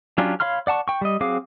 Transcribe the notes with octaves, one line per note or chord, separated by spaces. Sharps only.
F#3 C#4 D4 F4 G4
C#5 F5 B5 C6 F6
D5 F#5 A5 C#6
G5 C#6
G3 D#5
F#3 C4 G#4 F5 D6